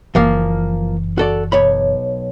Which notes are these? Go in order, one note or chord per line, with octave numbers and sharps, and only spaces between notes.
F#1 E3 F3 A#3 F5
F#4 A4 D5
B1 C#5 B5